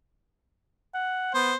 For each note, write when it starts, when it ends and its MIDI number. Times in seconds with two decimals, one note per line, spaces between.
0.94 1.34 78
1.34 1.53 59
1.34 1.56 72